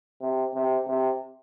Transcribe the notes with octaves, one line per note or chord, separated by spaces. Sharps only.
C3
C3
C3